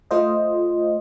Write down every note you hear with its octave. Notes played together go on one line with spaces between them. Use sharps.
A3 F4 C5 D#5